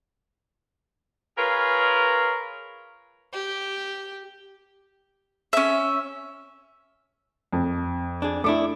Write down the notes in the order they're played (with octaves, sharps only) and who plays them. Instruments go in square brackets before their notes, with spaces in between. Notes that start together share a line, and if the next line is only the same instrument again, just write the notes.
[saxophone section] F4 G#4 A#4 B4 C#5
[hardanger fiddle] G4
[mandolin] C#4 E5
[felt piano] F2
[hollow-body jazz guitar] D4 G#4
[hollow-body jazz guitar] A3 D4 E4 [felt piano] D6